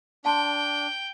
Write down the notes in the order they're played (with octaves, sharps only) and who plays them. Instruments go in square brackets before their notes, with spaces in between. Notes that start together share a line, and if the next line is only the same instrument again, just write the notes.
[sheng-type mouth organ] D4 [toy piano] F#5 A5 C6 [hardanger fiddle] G5